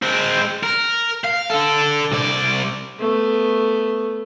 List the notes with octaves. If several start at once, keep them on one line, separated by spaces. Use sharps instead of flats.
G#3 C4
A#4
F5
D3 A4
C2 D5
A3 B3